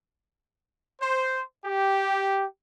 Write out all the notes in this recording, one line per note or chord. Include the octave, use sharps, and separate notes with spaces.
C5
G4